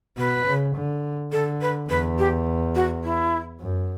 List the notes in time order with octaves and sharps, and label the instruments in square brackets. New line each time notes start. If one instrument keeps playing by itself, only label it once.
[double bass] B2 [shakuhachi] B4
[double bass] C#3
D3
[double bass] D3 [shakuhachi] A4
[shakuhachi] B4
[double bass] E2 [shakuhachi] B4
[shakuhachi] G4
F#4
E4
[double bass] F#2